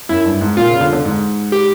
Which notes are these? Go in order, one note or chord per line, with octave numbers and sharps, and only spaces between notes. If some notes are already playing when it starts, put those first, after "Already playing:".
F#2 E4
G2
G#2
A#2 F4
C#3
D3
D3
G#2
G4